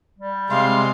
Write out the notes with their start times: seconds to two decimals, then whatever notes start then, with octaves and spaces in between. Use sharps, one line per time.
0.18 G3
0.50 C3 G#3 F5 C6